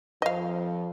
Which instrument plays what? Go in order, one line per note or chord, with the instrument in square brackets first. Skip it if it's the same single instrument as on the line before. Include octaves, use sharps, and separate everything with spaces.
[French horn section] F2 F3 [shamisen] D#5 F5